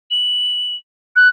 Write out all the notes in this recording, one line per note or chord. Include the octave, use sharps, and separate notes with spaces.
F#7
F#6